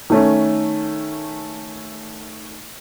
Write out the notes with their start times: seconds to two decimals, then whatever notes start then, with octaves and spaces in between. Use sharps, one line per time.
0.10 D#3 A3 C#4